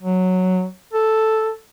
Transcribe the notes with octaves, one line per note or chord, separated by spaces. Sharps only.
F#3
A4